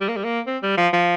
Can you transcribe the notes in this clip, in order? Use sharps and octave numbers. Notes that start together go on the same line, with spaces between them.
G3
A#3
G3
A#3
C4
G3
F3
F3